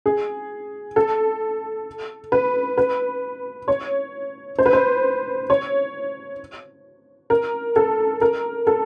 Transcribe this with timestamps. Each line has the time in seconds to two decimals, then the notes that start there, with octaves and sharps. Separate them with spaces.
0.06 G#4
0.96 A4
2.32 B4
2.78 B4
3.68 C#5
4.59 C5
4.66 B4
4.73 C5
5.50 C#5
7.30 A#4
7.76 A4
8.21 A#4
8.67 A4